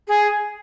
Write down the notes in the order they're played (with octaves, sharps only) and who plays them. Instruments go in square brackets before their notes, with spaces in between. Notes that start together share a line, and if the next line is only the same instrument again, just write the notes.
[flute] G#4